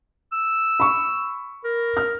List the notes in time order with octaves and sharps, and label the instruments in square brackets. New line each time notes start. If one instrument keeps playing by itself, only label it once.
[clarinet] E6
[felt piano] B5 C#6
[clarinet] A#4
[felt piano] F6